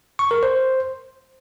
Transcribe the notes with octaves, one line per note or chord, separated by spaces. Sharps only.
C#6
A#4
C5